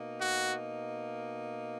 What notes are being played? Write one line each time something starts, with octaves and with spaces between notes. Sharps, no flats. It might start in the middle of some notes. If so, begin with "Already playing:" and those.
Already playing: B2 A#3 D#4
F#4